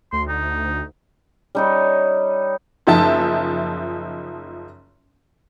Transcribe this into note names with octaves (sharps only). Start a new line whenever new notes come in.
D2 C6
D#4
G3 D#4 C#5
F#1 F3 D#4 E5 A5